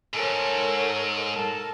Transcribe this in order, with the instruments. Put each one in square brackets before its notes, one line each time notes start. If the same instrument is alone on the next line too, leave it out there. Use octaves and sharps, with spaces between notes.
[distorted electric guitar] G#2 [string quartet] A4 A#4 C#5
[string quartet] A4 A#4 A5